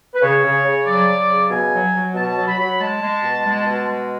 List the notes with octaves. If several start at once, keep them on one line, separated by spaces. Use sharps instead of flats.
B4
C#3 C#5
C#3
C#3
F#3 D5
F#3
C#3
B2 G#5
F#3
F#3
B2 A5
F#3
B5
F#3
G#3 A5
G#3
B2
G#3
B2
G#3